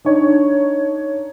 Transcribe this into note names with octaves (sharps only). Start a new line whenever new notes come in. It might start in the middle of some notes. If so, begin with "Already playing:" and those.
D4 D#4 C#5